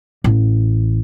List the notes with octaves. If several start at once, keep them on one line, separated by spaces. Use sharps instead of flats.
A1